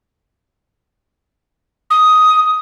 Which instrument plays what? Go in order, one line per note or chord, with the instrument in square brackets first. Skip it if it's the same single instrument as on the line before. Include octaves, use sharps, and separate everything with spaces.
[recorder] D#6